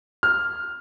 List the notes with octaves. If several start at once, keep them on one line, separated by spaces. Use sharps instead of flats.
F6